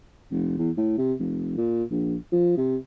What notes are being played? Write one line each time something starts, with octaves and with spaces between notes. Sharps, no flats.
F1
E2
A2
C3
F1
A#2
A#1
F3
C3